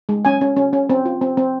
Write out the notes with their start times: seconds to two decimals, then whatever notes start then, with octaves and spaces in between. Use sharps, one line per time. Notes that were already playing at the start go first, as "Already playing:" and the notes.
0.09 G#3
0.25 C#4 G#5
0.41 C#4
0.56 C#4
0.73 C#4
0.90 C4
1.05 F4
1.21 C4
1.37 C4